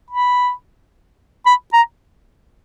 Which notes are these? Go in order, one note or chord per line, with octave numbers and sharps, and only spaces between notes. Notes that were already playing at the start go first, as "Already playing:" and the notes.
B5
B5
A#5